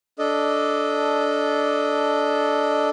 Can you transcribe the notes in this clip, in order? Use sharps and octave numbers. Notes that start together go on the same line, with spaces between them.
D4 A4 D#5